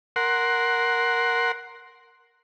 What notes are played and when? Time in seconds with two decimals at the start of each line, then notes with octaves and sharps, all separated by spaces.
0.16 A#4 F#5 C6